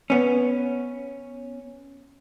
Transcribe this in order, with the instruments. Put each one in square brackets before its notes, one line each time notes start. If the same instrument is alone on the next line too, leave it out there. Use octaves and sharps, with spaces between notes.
[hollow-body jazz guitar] B3 C#4